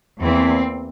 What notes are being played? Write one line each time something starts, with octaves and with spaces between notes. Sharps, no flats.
E2 E3 A#3 C4